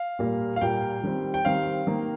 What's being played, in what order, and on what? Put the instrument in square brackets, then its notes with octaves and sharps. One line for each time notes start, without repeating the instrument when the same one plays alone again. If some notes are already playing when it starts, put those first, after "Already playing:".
Already playing: [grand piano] F5
A#2 G3 A#3
F5
A#2 G3 A#3 G5
D#3 G3 C4
G5
D#3 G3 C4 F5
D#3 A#3